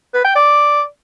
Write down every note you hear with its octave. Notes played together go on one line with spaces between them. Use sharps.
B4
G5
D5